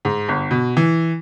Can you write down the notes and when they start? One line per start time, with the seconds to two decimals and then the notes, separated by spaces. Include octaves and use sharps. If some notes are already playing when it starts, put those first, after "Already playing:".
0.05 G#2
0.28 G1
0.51 B2
0.77 E3